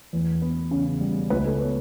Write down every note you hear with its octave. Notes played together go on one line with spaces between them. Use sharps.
E2
B3
C#3
G3
C#2 B4
A4
B3 C#5